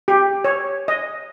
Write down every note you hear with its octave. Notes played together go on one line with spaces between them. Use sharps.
G4
C#5
D#5